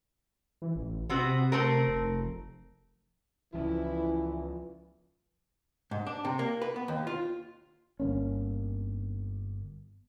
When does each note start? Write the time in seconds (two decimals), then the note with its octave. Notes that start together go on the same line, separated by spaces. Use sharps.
0.62 E3
0.75 A1
1.09 C3 B3 C4 F#4
1.52 A3 C4 A#4
1.88 F1
3.54 C#2 E3 F3 C#4 E4
5.91 G#2
6.07 D4
6.25 C3
6.39 A#3
6.62 B4
6.76 B3
6.88 D#2
7.07 F4
8.00 G1 A#3 C#4